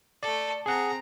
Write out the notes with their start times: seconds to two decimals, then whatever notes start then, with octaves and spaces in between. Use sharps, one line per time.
0.23 A3 A4 D5
0.66 C4 G#4 F#5 A#5